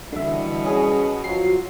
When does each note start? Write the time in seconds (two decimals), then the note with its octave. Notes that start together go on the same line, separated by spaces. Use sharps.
0.13 B2 D3 E3 G3 E5
0.64 C#4 G#4
1.24 F3 F#3 F4 F#4 C7